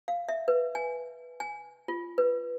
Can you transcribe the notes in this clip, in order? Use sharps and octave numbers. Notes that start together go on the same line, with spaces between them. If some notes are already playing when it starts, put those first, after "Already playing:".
F5
E5
B4
G#5
G#5
F4
B4